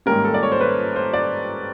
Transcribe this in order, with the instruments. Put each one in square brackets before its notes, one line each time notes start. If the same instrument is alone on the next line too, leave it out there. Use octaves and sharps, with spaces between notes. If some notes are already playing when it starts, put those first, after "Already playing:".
[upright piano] G#2 D#3 G3 A#3 C#4 A#4
A4
D5
C#5
C5
B4
C5
D5